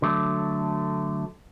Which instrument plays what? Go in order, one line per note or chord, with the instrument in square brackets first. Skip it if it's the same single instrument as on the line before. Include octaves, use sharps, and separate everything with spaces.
[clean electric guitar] D3 F#3 A3